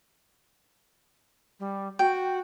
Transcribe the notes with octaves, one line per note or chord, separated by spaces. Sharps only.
G3
F#4 G5